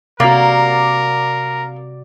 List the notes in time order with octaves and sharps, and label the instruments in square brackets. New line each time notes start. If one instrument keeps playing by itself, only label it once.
[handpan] C3 F#4 [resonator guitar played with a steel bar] A#3 [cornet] A#4 [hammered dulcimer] D5